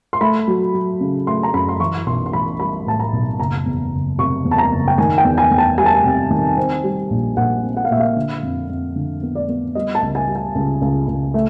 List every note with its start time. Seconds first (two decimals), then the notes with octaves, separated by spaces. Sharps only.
0.13 C6
0.21 A3 B5
0.48 F#3
0.74 F#3
1.00 C#3
1.27 A3 C6
1.43 A#5
1.53 F#2 B5
1.69 C6
1.80 E3 C#6
2.06 B1 C6
2.26 C6
2.33 E3 B5
2.59 G3 B5
2.86 A2 A5
2.99 A#5
3.13 B1
3.39 F#1 A#5
3.66 E2
3.92 F#1
4.18 C3 C#6
4.45 E2
4.51 A5
4.58 A#5
4.72 F#1
4.88 G5
4.98 D#3 G#5
5.18 G5
5.24 E2
5.38 G#5
5.51 E2
5.58 A5
5.78 G3 G#5
5.86 A5
5.94 G#5
6.04 C3
6.30 D#3
6.57 C4
6.84 G3
7.10 A#1
7.37 A#1 F#5
7.63 C4
7.77 F#5
7.85 F5
7.90 A#2 E5
8.00 F5
8.16 D3
8.43 F2
8.69 F2
8.96 D3
9.23 B3
9.35 D5
9.49 B3
9.75 G3 D#5
9.95 A5
10.02 C#2
10.15 G#5
10.28 G3
10.36 G#5
10.55 C#2
10.81 C#2
11.08 C#2
11.34 A3